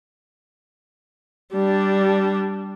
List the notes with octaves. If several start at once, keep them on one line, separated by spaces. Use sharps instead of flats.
G3 D4